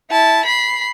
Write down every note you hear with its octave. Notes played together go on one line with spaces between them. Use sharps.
E4 A5
B5 C7